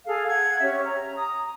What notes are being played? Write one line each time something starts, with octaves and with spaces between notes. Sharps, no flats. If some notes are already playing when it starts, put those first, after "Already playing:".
G#4 A4 F5
F#5 G#6
C#4 G4 C#5 E5
A#5
A#5 D#6